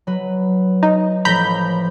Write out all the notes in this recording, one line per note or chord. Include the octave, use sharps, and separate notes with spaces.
F#3 B4
D#4
A1 F3 A#5 B5 G6